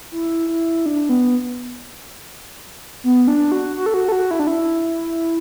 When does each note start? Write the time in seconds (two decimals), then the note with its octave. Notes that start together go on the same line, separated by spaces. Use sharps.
0.12 E4
0.48 E4
0.86 D4
1.09 B3
3.04 B3
3.28 D4
3.52 F#4
3.77 F#4
3.86 A4
3.94 F#4
4.09 A4
4.12 F#4
4.31 E4
4.39 D4
4.47 E4